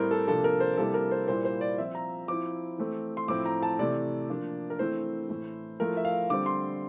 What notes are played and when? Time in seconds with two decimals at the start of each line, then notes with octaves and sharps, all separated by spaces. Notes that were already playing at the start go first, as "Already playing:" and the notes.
Already playing: A2 G3 C4 E4 A#4 C5
0.11 A4
0.28 C3 F3 A#3 D4 A4
0.44 A#4
0.60 C5
0.77 C3 G3 A#3 E4 A4
0.94 A#4
1.11 C5
1.28 A#2 G3 A#3 E4 C5
1.45 C5
1.61 D5
1.78 F3 C4 F4 E5
1.95 A#5
2.28 F3 C4 E4 D6
2.78 E3 A3 C4
3.17 C6
3.28 A2 F3 C4 E4 D6
3.46 A#5
3.63 A5
3.79 C3 E3 A3 D5
4.29 F3 A#3 D4
4.70 A#4
4.79 E3 A3 C4 E4 C5
5.29 A2 E3 A3 E4
5.80 F3 A3 E4 A#4
5.97 E5
6.05 F5
6.30 D3 G3 C4 D6
6.46 C6